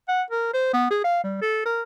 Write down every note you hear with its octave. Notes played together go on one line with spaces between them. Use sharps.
F#5
A#4
C5
B3
G#4
F5
G3
A4
A#4